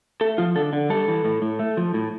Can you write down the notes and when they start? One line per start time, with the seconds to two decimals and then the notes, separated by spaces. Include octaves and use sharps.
0.21 A3 A4
0.38 F3 F4
0.56 D3 A4
0.73 D3
0.90 G3 A4
1.08 E3
1.25 A2
1.42 A2
1.59 A3
1.77 F3
1.94 A2